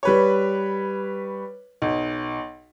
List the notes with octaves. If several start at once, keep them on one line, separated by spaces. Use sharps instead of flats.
G3 B4 C#5
B1